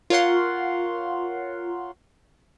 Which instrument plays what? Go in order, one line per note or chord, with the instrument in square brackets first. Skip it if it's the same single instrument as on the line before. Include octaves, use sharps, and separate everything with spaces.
[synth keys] F4 A#4 C#5 F5 F#5 C6